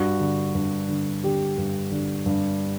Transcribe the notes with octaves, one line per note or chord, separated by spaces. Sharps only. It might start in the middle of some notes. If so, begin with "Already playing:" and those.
Already playing: G2 F#4
D3
G2
D3
D3 G4
G2
D3
G2